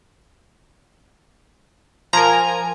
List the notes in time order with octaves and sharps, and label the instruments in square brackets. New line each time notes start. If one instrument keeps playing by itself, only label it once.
[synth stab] F3 A#4 [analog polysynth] G#5 [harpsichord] A#5